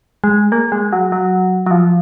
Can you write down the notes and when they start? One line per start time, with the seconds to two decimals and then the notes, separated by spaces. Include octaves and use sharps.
0.24 G#3
0.52 A#3
0.72 G#3
0.92 F#3
1.12 F#3
1.66 F#3
1.71 F3